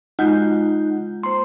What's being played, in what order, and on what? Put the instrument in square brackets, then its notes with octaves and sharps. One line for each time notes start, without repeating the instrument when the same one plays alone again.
[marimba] G#3 F4 F#4 [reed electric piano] D#4 [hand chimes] F#5 G6
[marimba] A#3 C5 [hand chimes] C6